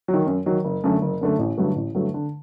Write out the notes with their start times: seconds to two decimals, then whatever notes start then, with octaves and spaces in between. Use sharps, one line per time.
0.08 F#3
0.14 D#3
0.27 F#2
0.46 D#3 F#3
0.64 F#1
0.84 F#2 D3 A3
1.02 F#1
1.21 F#2 D3 A3
1.39 A1
1.57 G2 D3 F#3 A3
1.76 A1
1.95 G2 D3 F#3 A3
2.14 D3